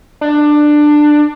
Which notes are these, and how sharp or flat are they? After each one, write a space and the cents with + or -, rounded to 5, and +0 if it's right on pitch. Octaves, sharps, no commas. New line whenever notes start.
D4 +15